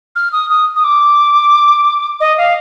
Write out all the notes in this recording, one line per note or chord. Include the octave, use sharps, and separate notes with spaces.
F6
D#6
D#6
D#6
D6
D#5
F5